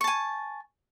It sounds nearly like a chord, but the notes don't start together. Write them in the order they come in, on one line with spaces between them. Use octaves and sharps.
C#6 A5 G#5